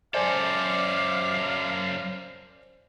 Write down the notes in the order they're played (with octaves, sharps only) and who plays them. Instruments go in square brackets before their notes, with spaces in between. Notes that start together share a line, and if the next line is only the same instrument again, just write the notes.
[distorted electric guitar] F#2 A4 [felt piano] C5 D5 G#5 [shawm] F5 [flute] D6